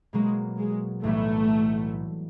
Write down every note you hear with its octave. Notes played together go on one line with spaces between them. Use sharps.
B2 F#3 G#3 A#3
G#3
B1 A2 E3 G3 A3 B3